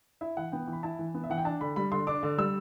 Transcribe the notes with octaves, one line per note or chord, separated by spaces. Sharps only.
E4 E5
E3 F#5
B3 G5
E3
B5
E4 A5
E3
B3
E5
E3 F#5
G5
D4 A5
D3 B5
G3 B5
D3 C6
D4 D6
D3
G3 E6